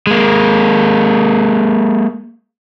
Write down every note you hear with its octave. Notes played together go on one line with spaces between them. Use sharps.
G#3 A#3